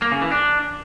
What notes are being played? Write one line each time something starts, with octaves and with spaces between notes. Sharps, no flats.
A#3
C#3
E3
D4